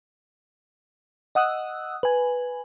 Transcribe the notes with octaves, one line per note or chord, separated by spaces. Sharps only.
D#5 F#5 D#6 E6 F#6
B4 G#5